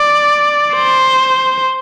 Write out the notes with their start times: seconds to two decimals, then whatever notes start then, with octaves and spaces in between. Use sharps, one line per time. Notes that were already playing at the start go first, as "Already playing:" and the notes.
Already playing: D5
0.75 C5